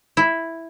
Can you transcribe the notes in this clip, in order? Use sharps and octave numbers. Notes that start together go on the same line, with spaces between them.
E4